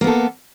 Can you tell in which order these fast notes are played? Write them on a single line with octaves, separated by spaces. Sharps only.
A#3 B3 A4